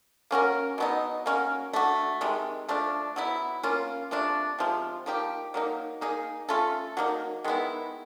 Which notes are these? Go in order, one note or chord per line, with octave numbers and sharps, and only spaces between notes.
A#3 C#4 F#4 A#4
B2 F#3 B3 D#4
A#3 C#4 F#4 A#4
A3 D4 F#4
C3 D#3 G#3
F3 A3 D4
F#3 B3 E4
A#3 C#4 F4
C3 F3 A3 D4
C3 F3 G#3
F3 A#3 D#4 G4
F#3 A#3 D#4
A#3 D#4 G#4
A3 C#4 F4 A4
F#3 A#3 D#4
D#3 G#3 B3 E4